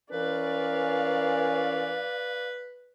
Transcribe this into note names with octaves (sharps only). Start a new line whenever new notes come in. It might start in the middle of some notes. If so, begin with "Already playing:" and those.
E3 C#4 A#4 B4 D5 F5